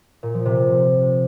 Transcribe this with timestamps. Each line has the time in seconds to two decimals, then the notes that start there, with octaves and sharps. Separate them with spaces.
0.23 A#2
0.34 F3
0.45 C3